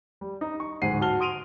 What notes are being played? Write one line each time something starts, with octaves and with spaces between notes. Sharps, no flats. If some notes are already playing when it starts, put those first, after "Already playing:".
G3
D#4
C#6
D1 G#2 G#3 F#5 C7 D#7
F#4 A5 F6 G7
C6 D#6 D7 D#7 F7